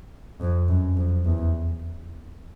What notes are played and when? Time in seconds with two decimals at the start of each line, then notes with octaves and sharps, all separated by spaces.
0.41 F2
0.69 F#2
0.97 F2
1.26 E2